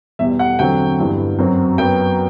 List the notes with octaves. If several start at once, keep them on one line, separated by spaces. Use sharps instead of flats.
E2 B2 G3 E5
F#5
E2 D3 F#3 C4 G5
G2 E3 B3
F#2 F#3 C4
F#2 F#3 B3 G5